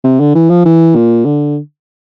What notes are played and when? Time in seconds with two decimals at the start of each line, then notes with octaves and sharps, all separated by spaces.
0.04 C3
0.20 D3
0.35 E3
0.50 F3
0.65 E3
0.95 A#2
1.26 D3